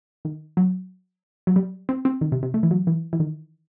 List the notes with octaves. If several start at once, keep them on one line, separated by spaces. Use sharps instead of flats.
D#3
F#3
F#3
G3
C4
C4
D#3
C3
C3
A3
E3
F#3
E3
E3
D#3